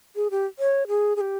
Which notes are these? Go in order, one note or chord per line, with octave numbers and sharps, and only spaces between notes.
G#4
G4
C#5
G#4
G#4
G4